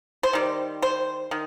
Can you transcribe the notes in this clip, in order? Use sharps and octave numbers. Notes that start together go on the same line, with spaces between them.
C5
D#3 G3
C5
D#3